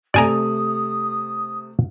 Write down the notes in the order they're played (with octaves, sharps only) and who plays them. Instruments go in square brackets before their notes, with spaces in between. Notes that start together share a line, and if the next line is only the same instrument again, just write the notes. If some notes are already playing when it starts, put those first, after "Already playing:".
[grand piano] C3 A3 [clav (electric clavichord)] D5 G#5 A#5 [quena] D#6